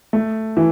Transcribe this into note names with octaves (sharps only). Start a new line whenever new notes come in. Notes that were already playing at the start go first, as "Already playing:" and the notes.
A3
E3